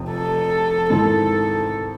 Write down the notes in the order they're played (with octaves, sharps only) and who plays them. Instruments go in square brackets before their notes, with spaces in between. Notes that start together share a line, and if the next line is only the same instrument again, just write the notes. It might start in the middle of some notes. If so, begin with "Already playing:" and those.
Already playing: [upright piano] F1 F2 C3
[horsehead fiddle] A4
[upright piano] G#2 D#3 G#3 C4 E4 [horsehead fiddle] A4